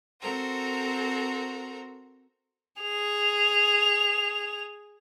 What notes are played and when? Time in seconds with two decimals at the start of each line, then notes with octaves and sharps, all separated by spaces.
0.20 C4 F#4 A4 A#4 C5
2.82 G#4 F7